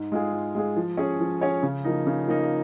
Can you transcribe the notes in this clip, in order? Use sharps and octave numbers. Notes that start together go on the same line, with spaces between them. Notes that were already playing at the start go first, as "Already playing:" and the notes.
Already playing: G#2
G#3 F4 G#4
G#2
G#3 F4 G#4
F3
C#4 G#4 C#5
F3
C#4 G#4 C#5
C#3
F3 A#3 D#4
C#3
F3 A#3 D#4